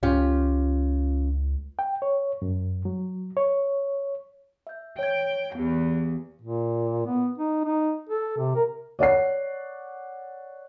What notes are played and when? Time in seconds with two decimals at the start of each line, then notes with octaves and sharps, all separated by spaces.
0.03 C#2 C#4 F4 G4
1.79 G5
2.02 C#5
2.42 F#2
2.85 F#3
3.37 C#5
4.67 E5 G6
4.99 C#5 G5 G#6
5.55 E2 B3 G4
6.41 A#2
7.06 B3
7.38 D#4
7.64 D#4
8.09 A4
8.37 C3
8.55 A#4
8.99 C#5 D5 F#5 C7